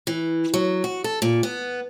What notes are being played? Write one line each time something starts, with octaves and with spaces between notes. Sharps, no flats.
E3
F#3
F#4
A4
A#2
B3